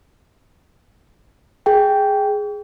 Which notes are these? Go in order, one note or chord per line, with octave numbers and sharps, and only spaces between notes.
G#4 G5